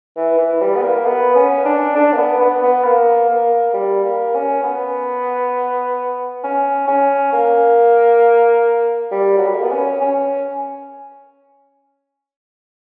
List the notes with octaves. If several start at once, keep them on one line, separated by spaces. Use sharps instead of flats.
E3
E3
G3
B3
A#3
B3
C#4
D4
D4
A#3
B3
B3
B3
A#3
A#3
G3
A#3
C#4
B3
C#4
C#4
A#3
G3
F#3
G3
A#3
B3
C#4
C#4